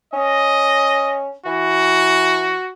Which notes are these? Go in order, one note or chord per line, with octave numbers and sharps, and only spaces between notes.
C#4 D#5
E3 F#4